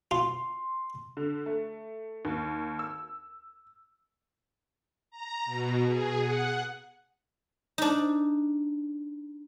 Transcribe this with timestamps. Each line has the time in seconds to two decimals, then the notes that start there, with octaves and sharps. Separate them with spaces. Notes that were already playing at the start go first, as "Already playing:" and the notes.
0.11 F4 C6
1.17 D3
1.46 A3
2.25 D#2
2.79 E6
5.11 A#5
5.45 B2
5.85 G#4
6.19 F#5
7.78 D4 D#4